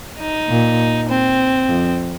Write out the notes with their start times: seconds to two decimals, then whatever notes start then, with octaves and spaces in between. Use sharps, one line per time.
0.19 D#4
0.48 A#2
1.09 C4
1.69 F2